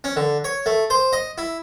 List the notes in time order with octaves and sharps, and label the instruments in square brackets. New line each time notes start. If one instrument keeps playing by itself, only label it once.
[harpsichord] C#4
D3
C#5
A3
C5
D#5
E4